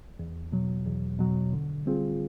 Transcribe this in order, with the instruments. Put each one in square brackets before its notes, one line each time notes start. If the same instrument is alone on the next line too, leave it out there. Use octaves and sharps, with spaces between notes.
[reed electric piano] E2
B2 F#3
E2
B2 F#3
D3
G3 C4 F4 G#4